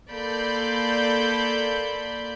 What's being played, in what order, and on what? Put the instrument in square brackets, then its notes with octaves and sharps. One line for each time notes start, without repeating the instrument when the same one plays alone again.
[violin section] A#3 A4 D5 B5 C6 G6